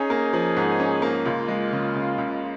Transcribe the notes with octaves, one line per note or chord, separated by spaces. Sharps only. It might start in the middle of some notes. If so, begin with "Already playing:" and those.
Already playing: C#4 D#4 G#4
A#3
F3
G#2
C#4
A#3
C#2 F4
G#3
C#3
C#2
C#2